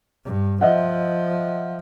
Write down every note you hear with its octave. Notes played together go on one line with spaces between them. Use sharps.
G2
F3 D#5 E5 F#5